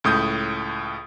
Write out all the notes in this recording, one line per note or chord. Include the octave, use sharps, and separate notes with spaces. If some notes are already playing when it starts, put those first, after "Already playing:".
C#2 A2 D#6 G6